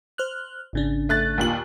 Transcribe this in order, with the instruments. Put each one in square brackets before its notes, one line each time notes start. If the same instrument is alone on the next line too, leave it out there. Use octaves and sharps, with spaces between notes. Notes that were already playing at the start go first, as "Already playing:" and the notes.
[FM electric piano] C5 F6 F#6
G#1 C#3 D4
[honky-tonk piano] A3 F#6 A6
D#2 A#2 F#7